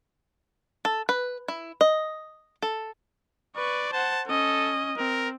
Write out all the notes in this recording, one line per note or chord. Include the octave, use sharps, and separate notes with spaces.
A4
B4
E4
D#5
A4
B4 D5 C#6
C5 F#5 A5
C#4 A4 D#5
C4 A#4